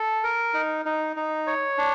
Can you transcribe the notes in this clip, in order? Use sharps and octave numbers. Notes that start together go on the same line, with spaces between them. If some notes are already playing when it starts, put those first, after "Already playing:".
Already playing: A4
A#4
D#4
D#4
D#4
C#5
D4